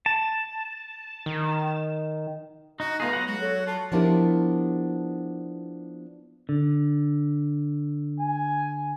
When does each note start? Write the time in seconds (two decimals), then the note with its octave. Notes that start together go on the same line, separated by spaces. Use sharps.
0.06 A5
1.26 D#3
2.80 D#4 F#4
3.00 A3 B3 F4 G#4 A#5
3.13 F#3 F#5
3.27 G#3 F#4
3.41 A4 C#5
3.67 F4 A5
3.92 F3 B3 D4 E4 G4 A#4
6.49 D3
8.20 G#5